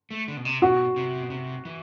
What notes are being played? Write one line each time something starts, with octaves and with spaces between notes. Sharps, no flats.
A3
D3
B2
C3
B2 F#4
C3
B2
C3
E3